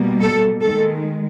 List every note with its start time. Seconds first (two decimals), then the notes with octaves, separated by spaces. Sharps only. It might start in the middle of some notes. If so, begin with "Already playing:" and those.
Already playing: B2 G3 A#3
0.20 A4
0.61 D#3 G#3 A4